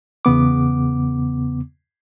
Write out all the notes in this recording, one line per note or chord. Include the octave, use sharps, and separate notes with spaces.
E2 C#3 B3 D6